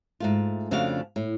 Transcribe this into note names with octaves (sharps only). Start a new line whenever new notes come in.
G#2 A3 F4
F2 C#3 A3 D4 F#4 F5
A2